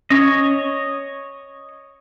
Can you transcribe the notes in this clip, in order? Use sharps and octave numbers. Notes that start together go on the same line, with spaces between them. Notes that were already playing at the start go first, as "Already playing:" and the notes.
C#4 C#5 D#5